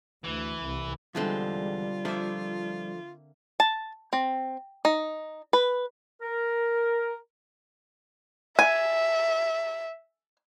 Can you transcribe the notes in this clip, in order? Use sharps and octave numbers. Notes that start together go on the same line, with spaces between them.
D2 E3
C2
E2 B2 D3 E3 G3 G#3 C4 F4
F3 A3 A#3 D4 E5
A5
C4
D#4
B4
A#4
E5 G#5